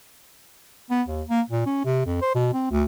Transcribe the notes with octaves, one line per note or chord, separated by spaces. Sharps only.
B3
D#2
A#3
A#2
C#4
C3
F2
C5
B2
C4
D2